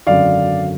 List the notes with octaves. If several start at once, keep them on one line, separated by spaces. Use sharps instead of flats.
G#1 F#2 D3 D5 F5